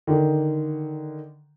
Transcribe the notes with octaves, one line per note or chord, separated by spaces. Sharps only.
D3 D#3